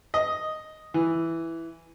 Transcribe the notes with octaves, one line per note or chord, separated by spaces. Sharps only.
D#5
E3